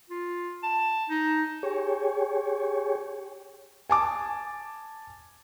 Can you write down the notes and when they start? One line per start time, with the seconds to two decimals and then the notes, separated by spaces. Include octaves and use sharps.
0.10 F4
0.63 A5
1.10 D#4
1.63 G4 G#4 C#5
3.90 G#5 A5 D6